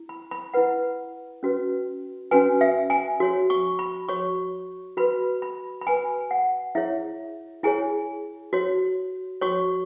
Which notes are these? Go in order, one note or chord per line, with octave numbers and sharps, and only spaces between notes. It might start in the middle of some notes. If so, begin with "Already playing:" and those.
Already playing: E4
B5
B5
E4 B4 F#5
C#4 F#4 B4
C#4 F#4 B4 G#5
E5
G#5
F#4 C#5
C#6
B5
F#4 C#5 C#6
F#4 B4 B5
B5
B5
F#4 B4 G#5
F#5
E4 G#4 C#5 E5
E4 G#4 C#5 G#5
F#4 C#5
F#4 C#5 C#6